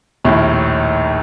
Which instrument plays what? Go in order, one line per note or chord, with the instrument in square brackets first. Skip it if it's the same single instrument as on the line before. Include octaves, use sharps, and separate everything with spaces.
[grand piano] A#1 D#2 A2